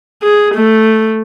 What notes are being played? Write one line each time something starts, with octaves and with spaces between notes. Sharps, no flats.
G#4
A3